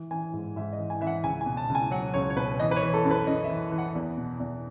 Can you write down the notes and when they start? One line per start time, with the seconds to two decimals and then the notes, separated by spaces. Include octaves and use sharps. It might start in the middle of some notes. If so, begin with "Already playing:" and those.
Already playing: E3
0.11 E3 G#5
0.34 G#2
0.56 G#2 E5
0.73 D#5
0.78 E3
0.90 G#5
1.01 E3 E5
1.07 F#5
1.24 C#2 G#5
1.41 G#5
1.46 B2
1.57 A5
1.69 C#2
1.75 G#5
1.91 F#3 F#5
2.14 C#2 C#5
2.30 C#5
2.36 B2 B4
2.59 E3 D#5
2.71 B4
2.76 C#5
2.82 E3
2.94 A4
3.04 F#2
3.11 B4
3.27 F#2 D#5
3.44 E5
3.50 E3
3.72 E3
3.78 F#5
3.95 E2
4.17 B2
4.40 E2